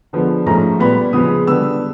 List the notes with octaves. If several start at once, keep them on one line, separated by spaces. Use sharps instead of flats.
D3 F3 G#3 B3
G#2 F3 A3 C#4 A#5
A#2 G3 B3 B5
C#3 F3 G#3 B3 D#6
D3 G3 B3 E6